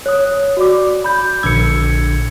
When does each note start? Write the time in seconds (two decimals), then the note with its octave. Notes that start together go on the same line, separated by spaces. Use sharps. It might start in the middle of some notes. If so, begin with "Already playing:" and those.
0.06 C#5 D#6
0.57 F#4 D5 D6
1.04 B5 G6
1.43 A#1 D3 E6 G#6 C#7